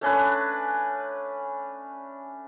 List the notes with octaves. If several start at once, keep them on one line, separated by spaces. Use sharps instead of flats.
A3 C#4 D4 B4